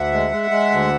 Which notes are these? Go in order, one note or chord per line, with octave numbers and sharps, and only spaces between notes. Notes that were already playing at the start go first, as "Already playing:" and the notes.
Already playing: D2 E5 F#5
G#3
G#3
G#3
D2